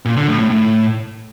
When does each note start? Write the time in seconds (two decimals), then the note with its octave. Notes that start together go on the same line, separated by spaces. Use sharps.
0.05 A#2
0.17 D3
0.28 A2
0.39 A2
0.50 A2